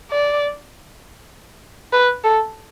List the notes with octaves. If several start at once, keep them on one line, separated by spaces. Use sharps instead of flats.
D5
B4
A4